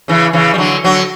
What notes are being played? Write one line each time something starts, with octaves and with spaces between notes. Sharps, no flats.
C#3 E3
C#3 E3
G3
D3 F#3
D3 F#3